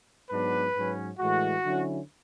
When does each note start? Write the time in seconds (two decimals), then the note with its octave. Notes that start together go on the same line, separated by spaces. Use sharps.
0.30 G#2 F#3 B3 D4 B4
0.75 G#2 F#3 C#4
1.19 A2 E3 G#3 F#4
1.65 D3 F#3 C#4 E4